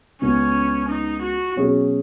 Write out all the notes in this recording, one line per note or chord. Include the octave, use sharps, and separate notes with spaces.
C#2 C#3 B3 C#4
D#4
F#4
B2 F#3 C#4 G#4